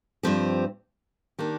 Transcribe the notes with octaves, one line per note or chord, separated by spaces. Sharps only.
G2 F3 C4 G4
D#3 A#3 D4 G4